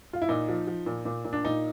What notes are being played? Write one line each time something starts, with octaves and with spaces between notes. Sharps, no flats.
F4
E4
A#2 D#4
F3
F3
A#2
A#2
A#2
D4
A#2 D#4